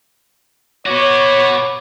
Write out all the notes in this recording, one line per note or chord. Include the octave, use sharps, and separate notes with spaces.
B3 F#4 C#5 D6